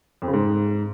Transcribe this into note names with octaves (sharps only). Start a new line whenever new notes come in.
F2
C#3
G#2